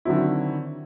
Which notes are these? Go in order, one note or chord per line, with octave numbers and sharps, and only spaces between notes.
D3 D#3 F#3 C4 E4